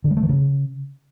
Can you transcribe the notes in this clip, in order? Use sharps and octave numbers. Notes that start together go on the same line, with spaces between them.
D3
G#3
A3
D#3
C#3